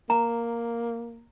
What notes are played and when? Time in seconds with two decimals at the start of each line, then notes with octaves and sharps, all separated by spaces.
0.10 A#3 A#5